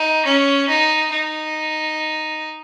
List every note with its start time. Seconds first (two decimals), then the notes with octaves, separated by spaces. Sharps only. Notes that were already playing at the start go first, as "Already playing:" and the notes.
Already playing: D#4
0.25 C#4
0.68 D#4
1.11 D#4